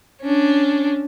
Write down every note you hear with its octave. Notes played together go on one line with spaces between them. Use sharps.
C#4 D4